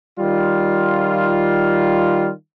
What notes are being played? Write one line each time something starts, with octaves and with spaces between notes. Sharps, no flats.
D#3 G3 F4